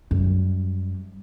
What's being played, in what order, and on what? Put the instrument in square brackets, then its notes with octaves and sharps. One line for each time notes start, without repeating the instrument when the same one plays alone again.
[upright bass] F#2 G3